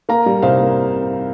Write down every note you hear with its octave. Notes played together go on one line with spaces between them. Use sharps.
A#3 F5 A#5
G3
C2 C5 F5
A#3